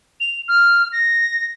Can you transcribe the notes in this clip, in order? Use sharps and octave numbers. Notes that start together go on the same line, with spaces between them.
F7
F6
A#6